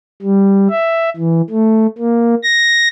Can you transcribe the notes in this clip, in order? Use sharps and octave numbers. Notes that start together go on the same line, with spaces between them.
G3
E5
E3
A3
A#3
A#6